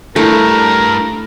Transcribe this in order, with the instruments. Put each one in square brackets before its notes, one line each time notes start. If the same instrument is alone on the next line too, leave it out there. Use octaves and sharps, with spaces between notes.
[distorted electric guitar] G2 [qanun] A3 [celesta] D4 E4 [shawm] A#4